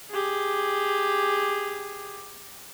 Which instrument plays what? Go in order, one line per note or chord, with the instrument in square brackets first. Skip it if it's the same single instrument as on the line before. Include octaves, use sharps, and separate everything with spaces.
[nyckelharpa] G4 G#4